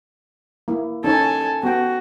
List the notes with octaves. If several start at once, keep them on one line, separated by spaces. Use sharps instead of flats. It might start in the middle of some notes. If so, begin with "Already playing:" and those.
A#3 E4
C#4 D#4 A4 C#5 G#5
B3 F#4 G5